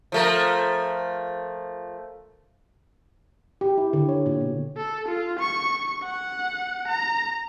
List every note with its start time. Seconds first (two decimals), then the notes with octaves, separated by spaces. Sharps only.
0.12 F3 A3 A#4
3.61 G4
3.78 E4
3.93 D3
4.09 C#5
4.26 A#2
4.41 B2
4.77 A4
5.08 F4
5.39 C#6
6.04 F#5
6.88 A#5